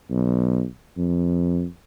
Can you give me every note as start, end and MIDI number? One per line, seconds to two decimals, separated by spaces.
0.10 0.63 35
0.97 1.65 41